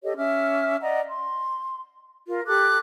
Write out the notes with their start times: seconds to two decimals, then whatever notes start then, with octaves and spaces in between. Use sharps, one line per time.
0.04 G4 A4 C#5 D#5
0.17 C#4 E5 D6 F6
0.82 D5 D#5 F#5 A#5
1.08 C6
2.28 F4 A#4
2.47 G4 A4 D6 F#6